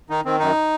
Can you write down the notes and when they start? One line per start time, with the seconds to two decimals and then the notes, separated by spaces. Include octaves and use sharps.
0.10 D#3 D#4
0.25 D#3 C4
0.40 F#2 D#4